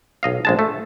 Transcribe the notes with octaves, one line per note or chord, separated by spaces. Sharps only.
B1 D#5 F5
A#1 G#3 A5
A3